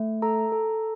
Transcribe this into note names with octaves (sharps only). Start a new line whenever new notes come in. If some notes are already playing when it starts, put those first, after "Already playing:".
Already playing: A3
A4 A#5
A4